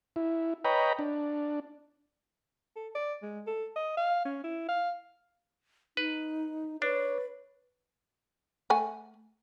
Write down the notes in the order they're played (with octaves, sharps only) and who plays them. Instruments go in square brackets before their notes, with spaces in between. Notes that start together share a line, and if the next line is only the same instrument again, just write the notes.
[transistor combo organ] E4
B4 C#5 D#5 G5 A#5 B5
D4
[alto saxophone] A4
D5
G#3
A4
D#5
F5
C#4
E4
F5
[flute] D#4 [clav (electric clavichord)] B4
[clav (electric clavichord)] D4 [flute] B4 [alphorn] C#5
[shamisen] A3 F#5 G#5